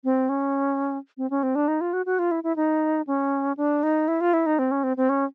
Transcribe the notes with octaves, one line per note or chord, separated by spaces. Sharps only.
C4
C#4
C4
C#4
C4
D4
D#4
F4
F#4
F#4
F4
E4
E4
D#4
C#4
D4
D#4
E4
F4
E4
D#4
C4
C#4
C4
C4
C#4